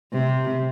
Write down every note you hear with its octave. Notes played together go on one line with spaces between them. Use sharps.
C3